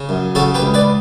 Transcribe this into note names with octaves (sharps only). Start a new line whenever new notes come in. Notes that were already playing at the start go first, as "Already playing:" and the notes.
Already playing: C#3
F#2
C#3 F#4 A4
G4 B4
C#2
B4 D5